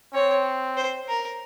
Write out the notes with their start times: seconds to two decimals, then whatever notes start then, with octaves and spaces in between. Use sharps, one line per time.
0.14 C4 C#5
0.77 C5
1.08 A#4